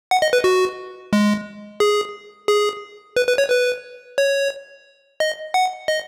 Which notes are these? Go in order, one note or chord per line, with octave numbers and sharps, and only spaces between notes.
F#5
D#5
B4
F#4
G#3
G#4
G#4
B4
B4
C#5
B4
C#5
D#5
F#5
D#5